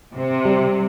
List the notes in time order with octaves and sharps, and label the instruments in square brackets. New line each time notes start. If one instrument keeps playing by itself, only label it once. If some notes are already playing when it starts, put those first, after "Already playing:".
[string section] C3
[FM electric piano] G3